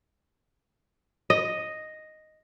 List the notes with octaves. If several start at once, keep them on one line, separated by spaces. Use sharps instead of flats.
D#5